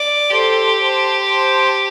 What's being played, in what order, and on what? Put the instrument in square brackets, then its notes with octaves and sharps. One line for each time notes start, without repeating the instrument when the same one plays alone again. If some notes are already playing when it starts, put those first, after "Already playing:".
Already playing: [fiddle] D5
[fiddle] G4 [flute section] A4 C5 A5 C6
[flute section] C5 A5 C6
C5 A5 C6